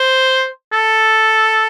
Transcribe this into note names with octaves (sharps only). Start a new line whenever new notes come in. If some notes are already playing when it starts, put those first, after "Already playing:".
Already playing: C5
A4